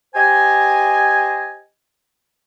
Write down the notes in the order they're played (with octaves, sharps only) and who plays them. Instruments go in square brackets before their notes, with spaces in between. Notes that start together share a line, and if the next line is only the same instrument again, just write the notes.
[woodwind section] G4 C5 D#5 G#5